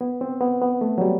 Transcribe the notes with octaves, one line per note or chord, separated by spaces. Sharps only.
B3
C4
B3
B3
A3
F#3
G3